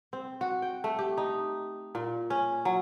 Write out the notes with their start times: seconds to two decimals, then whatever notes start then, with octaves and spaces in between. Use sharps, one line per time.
0.13 C4
0.41 F#4
0.62 G5
0.84 A3
0.99 G4
1.18 D#4
1.95 A#2
2.30 C#4
2.65 F#3